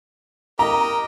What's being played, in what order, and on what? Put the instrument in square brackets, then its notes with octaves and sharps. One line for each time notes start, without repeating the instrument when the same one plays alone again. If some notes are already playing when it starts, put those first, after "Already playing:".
[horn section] G4 A#4 D#5 [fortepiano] A#5